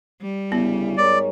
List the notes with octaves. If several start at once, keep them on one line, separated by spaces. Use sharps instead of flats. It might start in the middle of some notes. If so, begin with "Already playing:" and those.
G3
D2 C#3 B3 E4
G#2 A#4 C#5 D5